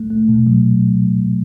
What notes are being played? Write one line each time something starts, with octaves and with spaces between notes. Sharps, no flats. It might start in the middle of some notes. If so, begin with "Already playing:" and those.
Already playing: A3
A3
B2
F#3